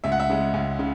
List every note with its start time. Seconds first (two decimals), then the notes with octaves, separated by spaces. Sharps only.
0.04 C#2 E5
0.12 F#5
0.20 E5
0.29 C#3 G#3
0.54 C#2
0.79 C#3